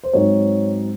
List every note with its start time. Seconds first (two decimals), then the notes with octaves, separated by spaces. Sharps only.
0.03 C5
0.13 G#2 F#3 C4 D#4 C#5